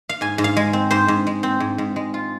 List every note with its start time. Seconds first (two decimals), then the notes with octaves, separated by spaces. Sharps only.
0.09 F5
0.21 G#2 G#5
0.38 G#2
0.44 F5
0.57 G#3
0.73 C4
0.91 G#2 C5
1.08 G#2
1.27 G#3
1.43 C4
1.60 G#2
1.78 G#2
1.96 G#3
2.14 F4